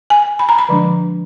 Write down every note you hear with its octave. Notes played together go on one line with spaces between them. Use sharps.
G#5
B5
A#5
B5
D3 F3 G#3 D4